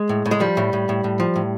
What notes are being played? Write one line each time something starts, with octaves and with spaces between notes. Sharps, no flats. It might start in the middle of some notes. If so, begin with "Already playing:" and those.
Already playing: G#3
A2
A2
G#3
F3 G3
A2
A2
A2
A2
F3
A2